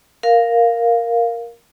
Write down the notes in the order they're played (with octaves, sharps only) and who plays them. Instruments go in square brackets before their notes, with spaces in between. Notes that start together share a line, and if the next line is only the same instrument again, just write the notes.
[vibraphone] A#4 F5